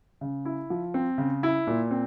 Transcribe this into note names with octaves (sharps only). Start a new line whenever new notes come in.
C#3
E4
F3
C4
C#3
E4
A#2
C4